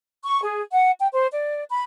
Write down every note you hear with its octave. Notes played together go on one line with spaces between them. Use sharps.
C#6
G#4
F#5
G5
C5
D5
B5